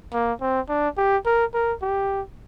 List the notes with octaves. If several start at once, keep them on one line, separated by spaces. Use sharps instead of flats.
A#3
C4
D4
G4
A#4
A#4
G4